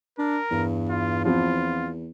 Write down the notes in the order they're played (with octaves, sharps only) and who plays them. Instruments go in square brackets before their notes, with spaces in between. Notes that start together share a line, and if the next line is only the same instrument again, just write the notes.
[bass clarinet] D4 [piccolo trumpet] A#4
[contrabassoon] E2 [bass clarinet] G2
[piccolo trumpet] F4
[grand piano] F3 B3 C4 [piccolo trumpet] F4